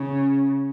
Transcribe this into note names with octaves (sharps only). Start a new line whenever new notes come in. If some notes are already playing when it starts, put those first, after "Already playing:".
Already playing: C#3